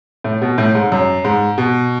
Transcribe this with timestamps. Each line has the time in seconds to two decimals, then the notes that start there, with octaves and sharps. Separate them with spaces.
0.24 A2
0.42 B2
0.58 A2
0.75 G#2
0.92 F#2
1.25 G#2
1.58 B2